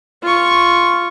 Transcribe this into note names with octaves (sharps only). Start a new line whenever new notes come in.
F4 C#6